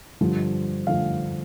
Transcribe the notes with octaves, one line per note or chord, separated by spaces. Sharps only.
G2 D3 F3
D3 F3 F5